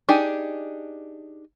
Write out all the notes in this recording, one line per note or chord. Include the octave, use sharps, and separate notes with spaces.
D4 D#4 G4 G#4